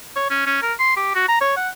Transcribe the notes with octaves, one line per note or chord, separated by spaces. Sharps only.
C#5
C#4
C#4
A#4
C6
G4
F#4
A#5
C#5
F#5